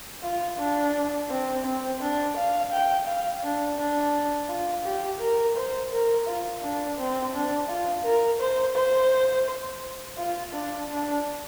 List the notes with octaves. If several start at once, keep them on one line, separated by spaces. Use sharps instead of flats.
F4
D4
C4
C4
D4
F5
G5
F5
D4
D4
F4
G4
A#4
C5
A#4
F4
D4
C4
D4
F4
A#4
C5
C5
F4
D4
D4